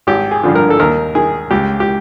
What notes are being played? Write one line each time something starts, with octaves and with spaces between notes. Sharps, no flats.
G#1 G4
G#4
G2 D3 F3
A#4
A4
D#2 A#4
D#3 G#4
C#2 G4
G4